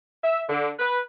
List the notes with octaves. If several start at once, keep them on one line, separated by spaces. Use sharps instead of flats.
E5
D3
B4